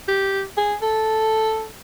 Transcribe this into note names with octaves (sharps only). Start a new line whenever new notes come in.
G4
G#4
A4